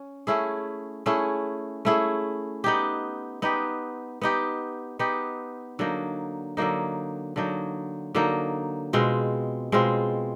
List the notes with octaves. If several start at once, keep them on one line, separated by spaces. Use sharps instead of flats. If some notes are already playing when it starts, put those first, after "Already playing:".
Already playing: C#4
A3 C#4 E4 G#4
A3 C#4 E4 G#4
A3 C#4 E4 G#4
B3 D#4 G4
B3 D#4 G4
B3 D#4 G4
B3 D#4 G4
D3 F#3 A#3 D#4
D3 F#3 A#3 D#4
D3 F#3 A#3 D#4
D3 F#3 A#3 D#4
B2 G#3 C4 F4
B2 G#3 C4 F4